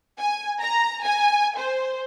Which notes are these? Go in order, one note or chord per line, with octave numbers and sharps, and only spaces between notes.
G#5
A#5
G#5
C5